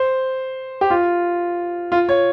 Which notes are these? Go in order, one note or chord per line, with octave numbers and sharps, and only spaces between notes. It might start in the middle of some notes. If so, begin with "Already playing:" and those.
Already playing: C5
G4
F4
F4
C#5